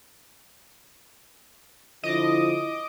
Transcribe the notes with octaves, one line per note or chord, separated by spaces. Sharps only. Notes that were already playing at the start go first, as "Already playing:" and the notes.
D3 F3 E4 D#5 D6